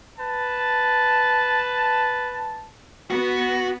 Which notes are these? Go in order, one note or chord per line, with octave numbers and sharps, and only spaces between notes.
B4 A5
B3 F#4